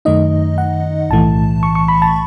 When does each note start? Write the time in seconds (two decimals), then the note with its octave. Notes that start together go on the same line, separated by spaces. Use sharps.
0.05 F#2 D#3 A3 D#4 D#5
0.58 F#5
1.10 B1 A2 E3 A3 A5
1.63 C#6
1.75 C#6
1.88 B5
2.02 A5